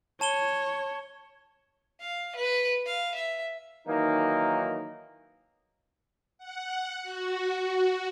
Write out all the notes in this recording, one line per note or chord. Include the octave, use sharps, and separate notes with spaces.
C#5 A5 E7 G7
F5
B4
F5
E5
D#3 E3 F#3 A#3 D#4
F#5
F#4